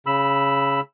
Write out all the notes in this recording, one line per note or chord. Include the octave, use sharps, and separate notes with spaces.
C#3 B5 E6